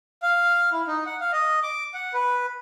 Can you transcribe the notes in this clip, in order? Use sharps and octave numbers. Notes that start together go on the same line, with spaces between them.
F5
E4
D#4
F#5
F5
D#5
D6
F#5
B4